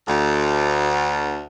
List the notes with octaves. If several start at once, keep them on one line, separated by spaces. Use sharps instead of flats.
D2